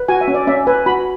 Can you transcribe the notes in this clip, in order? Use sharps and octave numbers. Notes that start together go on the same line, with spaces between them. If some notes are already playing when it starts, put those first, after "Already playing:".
Already playing: B4
F#4 G#5
E5
C#4
D5
C#4 E5
B4 G#5
F#4 B5